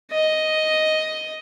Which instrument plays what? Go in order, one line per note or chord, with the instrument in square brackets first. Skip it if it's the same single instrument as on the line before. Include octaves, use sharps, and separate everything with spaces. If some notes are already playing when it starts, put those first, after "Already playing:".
[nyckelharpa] D#5